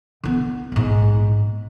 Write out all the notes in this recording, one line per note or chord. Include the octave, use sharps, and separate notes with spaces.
D3 B3
A#1 G#2